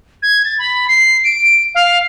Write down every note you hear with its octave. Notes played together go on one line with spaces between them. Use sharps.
G#6
A6
B5
C7
D7
F5